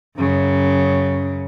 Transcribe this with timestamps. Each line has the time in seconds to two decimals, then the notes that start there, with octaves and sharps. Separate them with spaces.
0.17 F#2 C#3